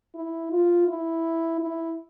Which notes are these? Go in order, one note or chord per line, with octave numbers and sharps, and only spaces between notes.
E4
F4
E4
E4